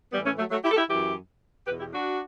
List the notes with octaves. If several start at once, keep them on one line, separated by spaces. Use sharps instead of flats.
A2 E3 G3 B3
A3 C#4
F#3 A3
F#3 A3
E4 G4
A4
E4 G4
F#2 E3 E4 G4
E2 B2 G4 B4
E4 G4
D4 F#4